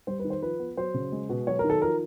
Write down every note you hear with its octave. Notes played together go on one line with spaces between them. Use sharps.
G3 C5
B4
D#3
C5
F3 B4
B3
F#3 C5
C#3
G#3
B2
F#3 C#5
A#4
D#3
A4
F3 A#4